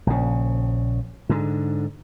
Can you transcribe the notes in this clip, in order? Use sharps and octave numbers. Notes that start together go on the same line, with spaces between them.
A#1 C#3
G#2 D3